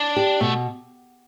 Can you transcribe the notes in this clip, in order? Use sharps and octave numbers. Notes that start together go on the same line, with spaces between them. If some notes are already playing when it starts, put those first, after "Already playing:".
Already playing: D4
G4
B2 A3